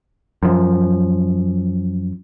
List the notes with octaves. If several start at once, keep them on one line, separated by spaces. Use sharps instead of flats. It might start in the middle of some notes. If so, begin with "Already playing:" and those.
F#2 F3